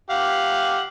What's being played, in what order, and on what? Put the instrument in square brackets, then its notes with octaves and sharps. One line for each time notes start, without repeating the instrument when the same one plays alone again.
[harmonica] G4 F5 F#5